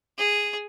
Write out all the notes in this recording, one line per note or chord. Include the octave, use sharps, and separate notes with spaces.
G#4